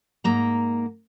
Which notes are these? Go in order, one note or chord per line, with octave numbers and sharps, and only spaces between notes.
G#2 A#3 A#5